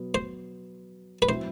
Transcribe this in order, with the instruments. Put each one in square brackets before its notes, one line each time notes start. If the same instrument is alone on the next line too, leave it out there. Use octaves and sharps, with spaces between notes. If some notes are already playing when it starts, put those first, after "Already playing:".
Already playing: [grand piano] B2 F#3 B3
[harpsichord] C5
B4
[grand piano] F#3 C4 E4 [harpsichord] C5